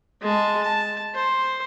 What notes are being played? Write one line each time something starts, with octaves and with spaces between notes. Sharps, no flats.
G#3 A5
A5
C5